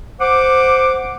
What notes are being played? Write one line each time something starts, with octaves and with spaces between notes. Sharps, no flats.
C5 F#5 D6